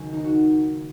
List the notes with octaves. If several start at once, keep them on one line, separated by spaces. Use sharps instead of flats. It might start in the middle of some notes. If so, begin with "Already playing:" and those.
Already playing: C#2 D#3 F#3 C#4
D#2 D#4
F#4